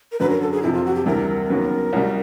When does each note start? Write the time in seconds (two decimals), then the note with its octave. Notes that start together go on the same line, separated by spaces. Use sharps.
0.12 A#4
0.20 F#2 D3 F#3 B4
0.30 A#4
0.42 A4
0.52 G#4
0.62 F2 C3 F3 E4
0.73 F4
0.85 F#4
0.95 G4
1.06 D2 C3 E3 G3 A#4
1.49 D#2 C#3 F#3 B3
1.93 C2 B2 G3